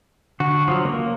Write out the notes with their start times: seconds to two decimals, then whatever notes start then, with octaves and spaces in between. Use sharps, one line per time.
0.40 D3 F#4
0.68 F3 F#3
0.85 C#2 A#3